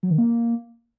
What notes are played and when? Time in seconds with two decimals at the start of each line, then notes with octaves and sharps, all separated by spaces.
0.03 F#3
0.11 D#3
0.18 A#3